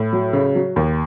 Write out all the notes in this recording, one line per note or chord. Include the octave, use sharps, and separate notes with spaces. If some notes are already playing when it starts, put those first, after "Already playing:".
Already playing: A2
F#3
C#3
F#3
D#2